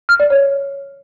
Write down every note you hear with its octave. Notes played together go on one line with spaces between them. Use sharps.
F6
D5
C#5